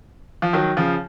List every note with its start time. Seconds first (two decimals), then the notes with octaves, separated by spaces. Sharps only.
0.42 F3
0.53 D#3 F#3
0.77 C#3 F3